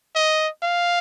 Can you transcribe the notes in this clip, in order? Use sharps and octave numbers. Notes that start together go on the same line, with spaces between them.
D#5
F5